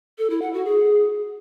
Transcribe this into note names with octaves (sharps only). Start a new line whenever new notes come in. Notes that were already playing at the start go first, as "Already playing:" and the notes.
A4
E4
F#5
F#4
G#4